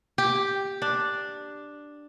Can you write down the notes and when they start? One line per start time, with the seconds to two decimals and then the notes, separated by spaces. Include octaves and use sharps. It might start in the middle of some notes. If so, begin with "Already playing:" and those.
0.18 G4
0.82 D4